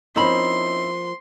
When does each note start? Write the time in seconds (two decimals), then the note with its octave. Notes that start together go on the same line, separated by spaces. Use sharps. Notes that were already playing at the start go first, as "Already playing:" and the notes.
0.16 F3 A#3 C4 C#4 D#4 E4 B5 C6